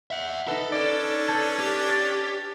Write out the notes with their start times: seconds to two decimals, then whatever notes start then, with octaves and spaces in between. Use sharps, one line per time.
0.11 E5 F#5
0.48 D#4 A4 B4
0.72 C#4 D4 D5
1.28 A5 G6 G#6
1.60 G4
1.89 A6